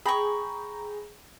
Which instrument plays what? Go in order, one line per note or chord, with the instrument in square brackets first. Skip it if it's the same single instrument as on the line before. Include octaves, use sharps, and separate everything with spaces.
[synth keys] G#4 G5 A#5 [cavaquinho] B5 C#6